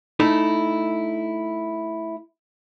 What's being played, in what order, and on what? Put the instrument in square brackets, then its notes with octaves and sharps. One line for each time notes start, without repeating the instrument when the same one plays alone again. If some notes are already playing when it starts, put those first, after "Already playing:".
[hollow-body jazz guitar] A3 D#4 E4